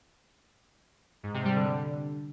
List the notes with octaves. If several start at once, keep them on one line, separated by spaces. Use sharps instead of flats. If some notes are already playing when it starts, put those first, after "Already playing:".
G#2
C3
G3
D3